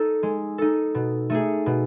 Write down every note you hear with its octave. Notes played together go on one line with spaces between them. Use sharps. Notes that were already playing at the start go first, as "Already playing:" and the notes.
Already playing: D#4 A4
G#3
D#4 A4
B2
A3 D#4 G#4
B2